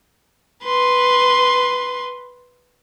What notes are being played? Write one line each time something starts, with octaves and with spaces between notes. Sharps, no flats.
B4 C6